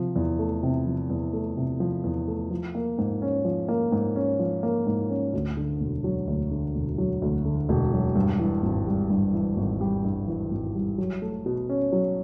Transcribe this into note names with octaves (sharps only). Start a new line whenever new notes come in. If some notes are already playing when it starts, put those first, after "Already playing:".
Already playing: C3 F3
E2
A3
C3
F3
E2
A3
C3
F3
E2
A3
F3
A#3
G#2
C#4
F3
A#3
G#2
C#4
F3
A#3
G#2
C#4
D2
D3
E1
F#3
D2
D3
E1
F#3
D2
D3
E1
F#3
G2
E3
G#1
G3
G2
E3
G#1
G3
G2
E3
G#1
G3
F#3
A3
B2
C#4
F#3